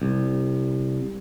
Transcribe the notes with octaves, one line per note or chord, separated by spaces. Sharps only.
C2